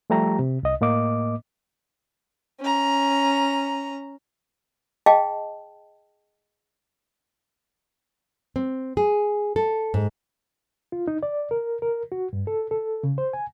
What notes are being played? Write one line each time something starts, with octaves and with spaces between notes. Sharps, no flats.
F3 G3 A3 G4 A#5
C3
C2 D#5
A2 A#3 D#5 D6
C#4 A#5
G#4 D#5 F5 G5 A5
C4
G#4
A4
G#2
F4
D#4
D5
A#4
A#4
F#4
G2
A4
A4
C#3
C5
G#5